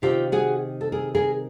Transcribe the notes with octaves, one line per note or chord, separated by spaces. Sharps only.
C3 D#3 F4 G4
F#4 G#4
A4
G#4 A#4
G#4 A#4